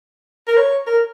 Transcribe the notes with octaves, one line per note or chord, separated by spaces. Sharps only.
A#4
C#5
A#4